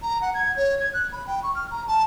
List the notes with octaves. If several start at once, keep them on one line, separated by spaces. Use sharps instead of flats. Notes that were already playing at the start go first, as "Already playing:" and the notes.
A#5
F#5
G#6
C#5
G#6
F#6
B5
G5
C#6
F6
A#5
A5